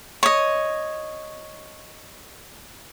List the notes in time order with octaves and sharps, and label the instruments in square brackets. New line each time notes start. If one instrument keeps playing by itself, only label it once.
[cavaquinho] C#5 D#5